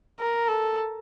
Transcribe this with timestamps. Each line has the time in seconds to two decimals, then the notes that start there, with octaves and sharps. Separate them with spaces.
0.20 A#4
0.48 A4